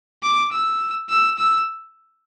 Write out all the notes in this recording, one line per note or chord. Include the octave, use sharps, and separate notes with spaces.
D6
E6
E6
E6